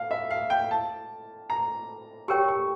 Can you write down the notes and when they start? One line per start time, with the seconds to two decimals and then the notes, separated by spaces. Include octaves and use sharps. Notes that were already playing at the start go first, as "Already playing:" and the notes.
Already playing: F5
0.11 E5
0.31 F5
0.50 G5
0.71 A5
1.50 A#5
2.28 G4 A#4 C#5 G5 C#6
2.48 C#6